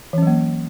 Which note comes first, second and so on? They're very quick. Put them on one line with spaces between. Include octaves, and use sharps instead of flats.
E3 C#4 F#3 A#3